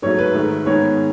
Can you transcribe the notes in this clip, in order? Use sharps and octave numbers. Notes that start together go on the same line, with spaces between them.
G#2 F#3 A3 C#5
B4
G#2 D#3 A3
G#2 D#3 G#3 B3 C#5